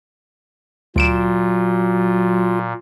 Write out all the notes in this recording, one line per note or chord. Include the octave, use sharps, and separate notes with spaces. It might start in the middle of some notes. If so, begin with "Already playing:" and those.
D2 A#2 F#3 F4 D7 E7